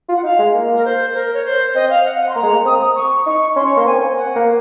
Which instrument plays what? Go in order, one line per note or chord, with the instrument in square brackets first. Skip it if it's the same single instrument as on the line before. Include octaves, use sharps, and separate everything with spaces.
[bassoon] F4
[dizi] F#5
[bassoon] D#4 [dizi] F5
[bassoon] G#3
A#3
[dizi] A#4
C5
A#4
C#5
C5
[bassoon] C4 [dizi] D#5
[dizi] F5
F#5
F#5
C6
[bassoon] A#3 [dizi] A#5
[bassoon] G#3
A#3
[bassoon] C4 [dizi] D#6
[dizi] D#6
C#6
[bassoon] D#4 [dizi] C#6
[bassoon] C#4 [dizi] C6
[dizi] C#6
[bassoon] A#3 [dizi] C6
[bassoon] C4 [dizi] G#5
[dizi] F#5
[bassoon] A#3